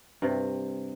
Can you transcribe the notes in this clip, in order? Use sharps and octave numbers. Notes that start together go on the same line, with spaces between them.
G2 C3